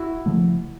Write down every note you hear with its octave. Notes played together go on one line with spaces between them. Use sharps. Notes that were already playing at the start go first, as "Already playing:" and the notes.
Already playing: E4 F#4
C#3 F3 A3